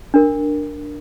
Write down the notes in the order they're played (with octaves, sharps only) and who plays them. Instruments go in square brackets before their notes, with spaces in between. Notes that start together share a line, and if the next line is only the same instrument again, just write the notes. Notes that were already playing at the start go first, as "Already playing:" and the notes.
[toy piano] D4 A#4